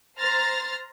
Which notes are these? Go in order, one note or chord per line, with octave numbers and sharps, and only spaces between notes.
C5 A#5 F6 A6